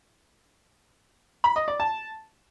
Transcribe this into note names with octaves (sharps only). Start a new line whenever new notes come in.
B5
D#5
D5
A5